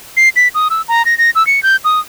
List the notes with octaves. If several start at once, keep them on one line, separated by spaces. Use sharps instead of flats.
C7
B6
D#6
E6
A#5
A#6
A#6
E6
C#7
G6
D#6